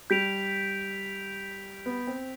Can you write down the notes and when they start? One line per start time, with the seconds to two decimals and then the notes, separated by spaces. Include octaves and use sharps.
0.10 G3 G6 B6 D7 F7
1.86 B3
2.07 C4